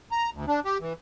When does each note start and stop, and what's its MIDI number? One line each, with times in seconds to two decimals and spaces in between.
0.12 0.30 82
0.33 0.45 38
0.47 0.60 62
0.65 0.78 67
0.80 0.93 52